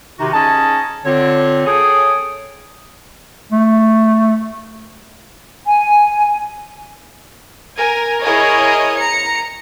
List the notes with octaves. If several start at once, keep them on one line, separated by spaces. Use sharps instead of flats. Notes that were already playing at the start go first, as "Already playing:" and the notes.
C3 D#3 D#4 F#4
C#4 D#4 G#4 D#5 A5
D3 C4 F4 C#5
G#4 A4 C#5 G5 D#6
A3
G#5
A#4 G#5
E4 G#4 A#4 C#5 D#5
A#5 C#7